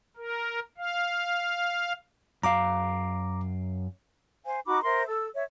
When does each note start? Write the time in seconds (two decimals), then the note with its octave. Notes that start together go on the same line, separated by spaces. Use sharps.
0.17 A#4
0.78 F5
2.43 F#2 F5 A#5 D6
4.45 C5 F5 G#5
4.66 D#4 F#4 B5 D6
4.83 A#4 C5 E5 C6
5.06 A4 E6
5.35 C#5 E5